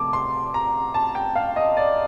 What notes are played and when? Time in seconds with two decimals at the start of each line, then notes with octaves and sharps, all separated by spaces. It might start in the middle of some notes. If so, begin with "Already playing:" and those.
Already playing: C3 F3 A3 C4 A5 D6
0.13 C6
0.54 A#5
0.94 A5
1.15 G5
1.36 F5
1.56 D#5
1.77 D5